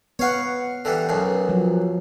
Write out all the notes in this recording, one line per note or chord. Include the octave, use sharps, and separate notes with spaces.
B3 C#5 F5 F#5 C#6
D3 E3 G3
B1 F#2 B2
F3 F#3